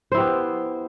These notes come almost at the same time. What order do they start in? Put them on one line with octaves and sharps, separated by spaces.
C5 E4 G4 B3